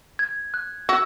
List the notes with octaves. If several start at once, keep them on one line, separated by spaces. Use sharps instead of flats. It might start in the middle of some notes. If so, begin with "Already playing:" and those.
G#6
F#6
F#4 E6